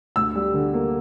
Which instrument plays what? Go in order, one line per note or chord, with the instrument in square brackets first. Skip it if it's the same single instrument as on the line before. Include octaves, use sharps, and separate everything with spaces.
[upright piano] D2 E6
G3
D3
A#3